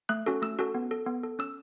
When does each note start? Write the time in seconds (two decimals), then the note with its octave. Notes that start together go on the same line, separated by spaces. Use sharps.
0.09 A3 F#6
0.26 C#4 F#4 A4
0.42 A3 E6
0.59 C#4 F#4 A4
0.74 B3
0.91 A4
1.07 B3
1.23 A4
1.39 C#4 E6